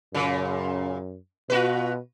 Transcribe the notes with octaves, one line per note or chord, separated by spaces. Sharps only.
F#2 A#2 C#3
B2 F4 F#4 B4